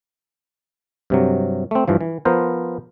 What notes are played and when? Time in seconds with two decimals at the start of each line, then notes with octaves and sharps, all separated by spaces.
1.10 G2 C3 F#3
1.71 A3 C4
1.88 G2 E3 F3
2.01 E3
2.25 F3 B3 A#4 C5